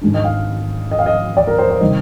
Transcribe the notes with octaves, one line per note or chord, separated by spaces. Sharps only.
G#2 D#3 G#3 D4
D#5
F5
D#5
F5
D#5
D5
A#4
C5
C5
C3 D#3 G3 D#5